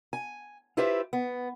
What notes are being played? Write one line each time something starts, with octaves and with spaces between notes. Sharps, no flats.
G#5
E4 F4 G4 B4 C5 E5
B3